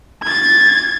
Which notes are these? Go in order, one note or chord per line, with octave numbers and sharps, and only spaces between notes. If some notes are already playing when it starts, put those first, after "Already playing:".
G#6 A6